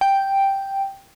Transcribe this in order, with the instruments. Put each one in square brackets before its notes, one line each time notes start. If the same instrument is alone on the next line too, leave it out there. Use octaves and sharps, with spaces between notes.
[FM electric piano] G5